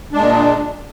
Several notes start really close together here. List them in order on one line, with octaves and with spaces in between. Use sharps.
D4 G#3 A#2